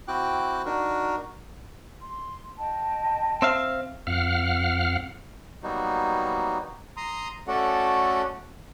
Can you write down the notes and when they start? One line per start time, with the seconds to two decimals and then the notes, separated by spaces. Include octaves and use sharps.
0.08 C4 E4 F#4 G5 D6 F#6
0.65 D4 D#4 F#4 A#4
2.01 C6
2.58 D#5 G5 A5
3.42 C4 E5 F5
4.07 F2 F5 F#5 F6
5.63 F#3 G3 A#3 B3 D#4 F#4
6.97 A#5 C6 D#6
7.48 A3 C#4 F#4 A4 D5 F#5